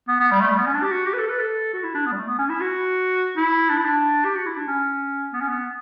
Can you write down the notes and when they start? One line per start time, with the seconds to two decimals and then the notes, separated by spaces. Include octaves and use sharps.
0.08 B3
0.20 B3
0.31 G3
0.41 A3
0.50 G3
0.58 B3
0.66 C#4
0.74 D4
0.83 G4
0.91 F#4
1.07 G4
1.14 B4
1.18 A4
1.29 B4
1.39 A4
1.73 F#4
1.84 E4
1.94 D4
2.06 B3
2.12 G3
2.17 A3
2.27 B3
2.39 C#4
2.49 E4
2.61 F#4
3.37 E4
3.70 D4
3.77 E4
3.85 D4
4.25 G4
4.36 F#4
4.46 E4
4.57 D4
4.67 C#4
5.33 B3
5.41 C#4
5.48 B3